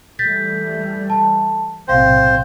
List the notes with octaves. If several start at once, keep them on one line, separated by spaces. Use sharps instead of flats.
E3 G3 A3 G6 A6 B6
A5
B1 A2 C3 C5 F5 G5